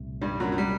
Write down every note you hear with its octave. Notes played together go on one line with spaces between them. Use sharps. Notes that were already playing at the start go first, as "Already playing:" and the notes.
Already playing: C2 A#2 A3
G2 G3
F#2 F#3
F#3
G3